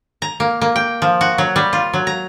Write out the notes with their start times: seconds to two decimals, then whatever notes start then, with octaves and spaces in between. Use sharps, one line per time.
0.22 A#5
0.40 A#3
0.61 A#3
0.76 G5
1.02 F3
1.21 F#4
1.38 F#3
1.56 G3
1.73 F4
1.93 F#3
2.07 A#5